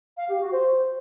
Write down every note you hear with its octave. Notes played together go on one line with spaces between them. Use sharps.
F5
G4
F#4
C5